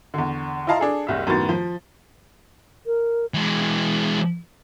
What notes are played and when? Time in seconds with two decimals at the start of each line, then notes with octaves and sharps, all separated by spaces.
0.14 E2 D3
0.67 E4 F4 D#5 F5 A5 A#5
0.79 D4 G#4 A4
1.07 F#1 C2 E5
1.27 F#2 A2 D#3 B3 A6
1.49 F3
2.86 A#4
3.34 E3 G#3